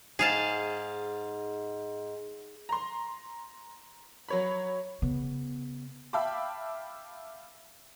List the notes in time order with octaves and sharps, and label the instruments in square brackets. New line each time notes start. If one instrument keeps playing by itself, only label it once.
[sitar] G#2 [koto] G#4 F5 A5
[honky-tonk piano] A#5 C6
F#3 C#5 B5
[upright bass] C#3 B3
[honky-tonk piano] E5 F5 G5 A5 B5 D6